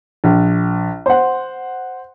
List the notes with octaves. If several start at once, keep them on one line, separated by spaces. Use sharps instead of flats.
A#1
C5 F#5